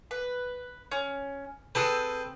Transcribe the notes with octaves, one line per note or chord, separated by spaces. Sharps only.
B4
C#4
C4 G#4 A4 B4 F#6